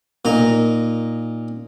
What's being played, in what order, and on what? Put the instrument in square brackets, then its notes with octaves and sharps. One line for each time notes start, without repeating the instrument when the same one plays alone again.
[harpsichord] A#2 D#4 A#5